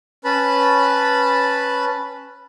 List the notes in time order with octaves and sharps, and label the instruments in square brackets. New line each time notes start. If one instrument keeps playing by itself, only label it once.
[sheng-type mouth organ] C#4 B4 A5 B5